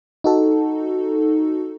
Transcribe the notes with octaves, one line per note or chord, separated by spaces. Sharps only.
D#4 F#4 A4